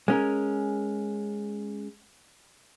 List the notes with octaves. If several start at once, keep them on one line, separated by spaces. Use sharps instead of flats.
G#3 C#4 A#4